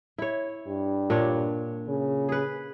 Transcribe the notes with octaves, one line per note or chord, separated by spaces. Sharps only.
E4 C#5
G2
A#2 D4 C#5
C#3
G#4 B4